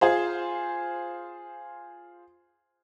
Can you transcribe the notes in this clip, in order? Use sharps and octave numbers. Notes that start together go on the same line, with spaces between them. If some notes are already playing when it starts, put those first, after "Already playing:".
F4 G#4 C5